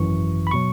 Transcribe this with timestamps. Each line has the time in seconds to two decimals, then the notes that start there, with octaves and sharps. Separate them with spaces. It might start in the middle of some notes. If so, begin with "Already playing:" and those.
Already playing: G#1 F#2 E3 C#6
0.47 B5
0.51 B2 F#3 C#6